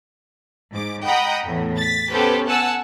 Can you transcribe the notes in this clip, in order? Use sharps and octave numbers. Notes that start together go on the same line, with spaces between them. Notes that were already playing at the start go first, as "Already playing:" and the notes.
G#2 D6
D#5 F#5 G5 A#5 B5 D#6
E2 A2
A6 B6
B3 C#4 G4 A4 B4 C5
F#5 G#5 A5 E6